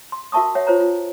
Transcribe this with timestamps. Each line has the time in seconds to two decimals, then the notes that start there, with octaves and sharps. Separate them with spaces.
0.12 C6
0.32 F#4 A#4 E5 A5 C#6 D#6
0.55 C#5 E5 F#5
0.67 F4 C5 C#5 A#5
0.80 F4